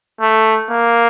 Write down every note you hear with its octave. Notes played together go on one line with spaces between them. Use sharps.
A3
A#3